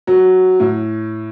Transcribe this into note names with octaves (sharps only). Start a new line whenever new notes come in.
F#3
A2